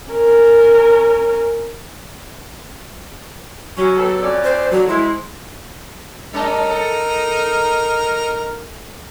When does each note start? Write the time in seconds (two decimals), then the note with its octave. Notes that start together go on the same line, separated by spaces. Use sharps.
0.10 C#4 A#4
3.77 F#3 C#4
3.96 B3 G4 A4
4.22 F2 C#4 D5
4.44 C5
4.71 D3 F#3
4.88 G#3 E4 C5
6.33 G3 C#4 D#4 A#4 D#5
6.69 A4